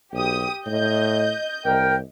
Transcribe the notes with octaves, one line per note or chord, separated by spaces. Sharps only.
B1 G4 D#6
A2 D#5 G6
C2 A#4 G5